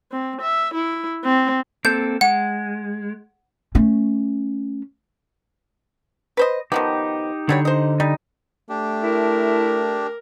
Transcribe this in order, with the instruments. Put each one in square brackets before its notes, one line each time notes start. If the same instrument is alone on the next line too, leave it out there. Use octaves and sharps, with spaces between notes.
[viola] C4
E5
E4
C4
[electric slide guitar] A#3 C4 A4 [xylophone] G6
[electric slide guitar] G#3 [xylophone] F#5
[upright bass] A3 C#4
[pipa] B4 C5 D#5
[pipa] D#3 F3 B3 [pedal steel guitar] D#4 G4
[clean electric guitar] D3 [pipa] F#3 G3 C#5
[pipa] C5 D#5
[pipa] G3 [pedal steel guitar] D#4
[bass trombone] A3 [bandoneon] D4 G4
[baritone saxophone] E4 [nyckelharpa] A#4